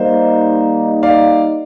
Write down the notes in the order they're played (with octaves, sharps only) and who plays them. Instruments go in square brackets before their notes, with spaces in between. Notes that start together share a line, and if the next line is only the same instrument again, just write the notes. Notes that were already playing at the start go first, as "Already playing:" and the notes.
Already playing: [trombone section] G3 A#3 D#4 [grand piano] C5
[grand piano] D5 F5